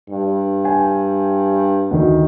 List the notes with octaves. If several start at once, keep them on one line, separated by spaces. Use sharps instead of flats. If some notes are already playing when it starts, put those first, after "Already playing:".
G2
G5 G#5
D2 D#3